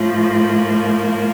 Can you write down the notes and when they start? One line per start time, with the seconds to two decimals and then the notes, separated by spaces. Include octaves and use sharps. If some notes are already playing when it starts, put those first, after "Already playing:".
Already playing: A2 F3
0.11 A#3